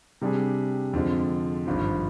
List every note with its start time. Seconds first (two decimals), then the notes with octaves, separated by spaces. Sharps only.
0.21 C3 G3 D4 G#4
0.93 F2 D3 F3 G#3
1.66 G#1 G2 F3